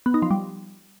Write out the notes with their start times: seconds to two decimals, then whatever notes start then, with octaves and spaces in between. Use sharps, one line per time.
0.06 B3
0.14 D#4
0.22 F3
0.31 G3